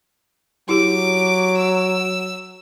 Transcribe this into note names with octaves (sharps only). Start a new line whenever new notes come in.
F#3 E4 G4 D6
E6